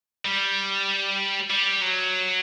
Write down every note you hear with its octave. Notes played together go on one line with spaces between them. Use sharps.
G3
G3
F#3